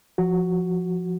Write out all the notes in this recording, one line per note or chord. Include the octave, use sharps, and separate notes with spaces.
F3 F#4